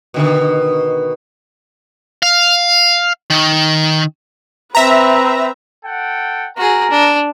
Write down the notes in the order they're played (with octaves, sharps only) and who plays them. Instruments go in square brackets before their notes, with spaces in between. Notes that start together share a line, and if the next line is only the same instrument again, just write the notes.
[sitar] B2 D3 D#3
[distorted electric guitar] F5
D#3
[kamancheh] C4 B4 [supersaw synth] E5 A#5
[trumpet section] A4 F#5 G5
[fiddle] F#4 G#4 [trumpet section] A#4 A#5
[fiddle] D4